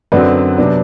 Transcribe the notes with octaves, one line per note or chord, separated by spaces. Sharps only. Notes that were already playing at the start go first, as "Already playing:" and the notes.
F#2 D3 F#3 C4 B4 D5
C3 F#3 B3 D4